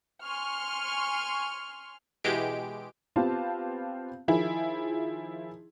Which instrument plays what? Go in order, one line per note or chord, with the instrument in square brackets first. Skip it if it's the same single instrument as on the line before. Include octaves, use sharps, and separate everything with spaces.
[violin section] G#5 C6 C#6 F6
[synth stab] B2 E3 G#3 G4 D7
[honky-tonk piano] B3 C4 F4 G4 F5 A5
D#3 F3 E4 G#4